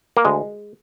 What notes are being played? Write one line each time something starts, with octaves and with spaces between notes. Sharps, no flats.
A#3
D2 G#3